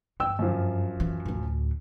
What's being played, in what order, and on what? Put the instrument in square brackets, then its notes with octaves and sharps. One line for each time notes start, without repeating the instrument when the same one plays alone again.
[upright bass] G2 [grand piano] G5 E6
[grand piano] F#2 F3
[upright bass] E3
D2 A2